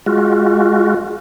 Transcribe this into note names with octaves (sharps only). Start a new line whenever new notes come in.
G#3 F4 F#4